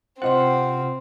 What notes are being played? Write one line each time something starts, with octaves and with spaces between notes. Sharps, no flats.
C3 C4 F4 C5 D#5 F#5 C6